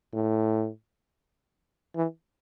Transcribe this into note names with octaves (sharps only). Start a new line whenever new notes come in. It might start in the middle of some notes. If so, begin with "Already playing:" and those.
A2
E3